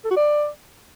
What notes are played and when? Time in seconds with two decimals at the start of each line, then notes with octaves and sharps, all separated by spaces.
0.05 A4
0.11 F#4
0.17 D5